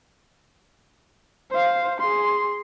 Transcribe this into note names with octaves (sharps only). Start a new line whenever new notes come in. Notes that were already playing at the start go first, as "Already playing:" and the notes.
C5 F5
G#4 C6